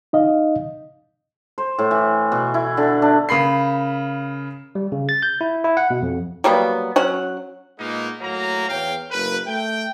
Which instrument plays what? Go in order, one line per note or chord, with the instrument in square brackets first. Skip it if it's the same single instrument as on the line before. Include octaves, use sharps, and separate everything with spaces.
[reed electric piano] D#4 D#5 F5
[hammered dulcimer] C5
A2
E3
B2
E4
D3
D4
[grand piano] C#3 A#4 B5 C7
[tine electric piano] G3
C#3
A6
G6
E4
E4
F#5
B2
F2
[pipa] F#3 G3 A#3 B3
F#3 C#4 F#5
[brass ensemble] A#2 G#3 A#3 B3 D#4
A2 F#3 A#3 A#5
E2 C#5 F5 G5
F#1 A#4 B4
A3 G5